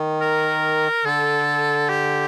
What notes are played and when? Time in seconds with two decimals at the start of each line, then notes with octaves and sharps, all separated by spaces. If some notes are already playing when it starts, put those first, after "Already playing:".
Already playing: D#3
0.21 A#4
1.05 D3 A4
1.89 G4